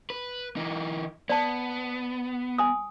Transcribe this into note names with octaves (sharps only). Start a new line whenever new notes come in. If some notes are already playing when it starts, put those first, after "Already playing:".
B4
E3 D#4
B3 D5 A5
G#5 D#6